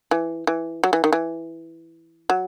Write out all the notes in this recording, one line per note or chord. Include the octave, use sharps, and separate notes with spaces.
E3
E3
F#3
E3
D#3
E3
F#3